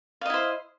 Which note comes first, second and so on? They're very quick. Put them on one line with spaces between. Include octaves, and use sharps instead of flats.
F5 D#5 E4 C5